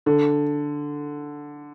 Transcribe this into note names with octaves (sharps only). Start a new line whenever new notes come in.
D3